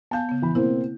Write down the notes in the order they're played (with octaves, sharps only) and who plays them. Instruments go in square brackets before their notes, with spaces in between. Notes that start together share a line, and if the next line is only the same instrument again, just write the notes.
[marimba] B3 F5 G#5 [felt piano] A5 G6
[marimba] C#3 B3
[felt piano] E3 B5
[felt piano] B2 A#3 C4 [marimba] E4